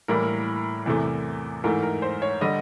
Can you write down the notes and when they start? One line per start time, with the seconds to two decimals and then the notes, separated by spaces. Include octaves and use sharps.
0.08 A2 E3 G3 A#3 A#4
0.86 E2 C3 E3 A3
1.64 G#2 E3 A3 A#4
1.83 A#4
2.02 C5
2.22 C#5
2.41 D3 G3 D#5